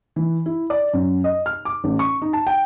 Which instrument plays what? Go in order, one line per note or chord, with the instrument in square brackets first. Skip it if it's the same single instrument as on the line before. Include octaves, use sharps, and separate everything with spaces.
[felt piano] E3
E4
D5
F#2
D#5
F6
D6
A1
C#6
D#4
A5
G5